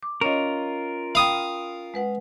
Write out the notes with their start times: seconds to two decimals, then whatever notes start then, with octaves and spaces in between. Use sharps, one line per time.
0.03 D6
0.21 C#4 F4 A#4 C#5 D#5
1.15 F5 G5 B5 D#6
1.94 G#3 B4 F#5